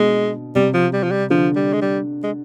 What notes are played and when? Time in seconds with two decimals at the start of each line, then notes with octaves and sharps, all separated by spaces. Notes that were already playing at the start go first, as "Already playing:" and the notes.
Already playing: B2 D3 G#3
0.55 C3 G3
0.74 F3
0.93 G3
1.03 F3
1.11 G3
1.30 D3 F3
1.56 G3
1.73 G#3
1.82 G3
2.23 G#3